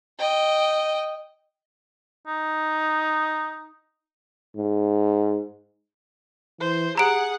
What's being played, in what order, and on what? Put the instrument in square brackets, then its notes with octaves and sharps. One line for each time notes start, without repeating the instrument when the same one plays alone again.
[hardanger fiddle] D#5 G5
[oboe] D#4
[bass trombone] G#2
[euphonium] E3 [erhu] C5
[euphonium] G4 [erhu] G#4 [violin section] F#5 [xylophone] A#5 D7